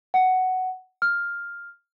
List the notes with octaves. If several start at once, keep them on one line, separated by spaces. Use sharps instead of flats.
F#5
F6